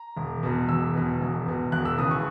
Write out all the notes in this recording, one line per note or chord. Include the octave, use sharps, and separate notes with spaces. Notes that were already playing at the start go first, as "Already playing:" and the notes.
Already playing: A#5
E1
E2 B2
E1 E6
E2 B2
E1
E2 B2
E1 F#6
E6
D#2 C#3 E3 D#6
C#6